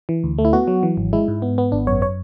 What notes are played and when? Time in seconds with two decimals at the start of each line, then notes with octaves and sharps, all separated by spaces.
0.09 E3
0.24 D2
0.38 A3
0.45 E4
0.53 B3 F#4
0.68 F#3
0.83 E3
0.97 G#1
1.13 G#3 E4
1.28 G#2
1.42 B3
1.58 B3
1.72 G#1 D4
1.87 F#2 C#5
2.02 C#5